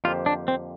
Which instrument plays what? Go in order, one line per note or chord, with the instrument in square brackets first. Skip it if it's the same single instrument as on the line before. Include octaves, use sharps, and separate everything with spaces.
[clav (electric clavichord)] F2 D3 A#3 G4 C5 [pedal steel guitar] F4
[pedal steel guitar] D4
C4